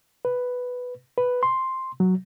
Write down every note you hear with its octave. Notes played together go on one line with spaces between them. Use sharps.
B4
B4
C6
F#3